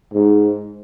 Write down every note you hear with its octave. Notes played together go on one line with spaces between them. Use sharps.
G#2